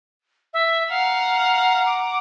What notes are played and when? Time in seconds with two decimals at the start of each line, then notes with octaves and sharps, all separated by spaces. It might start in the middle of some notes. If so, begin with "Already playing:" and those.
0.54 E5
0.90 F5 F#5 A#5
1.86 D6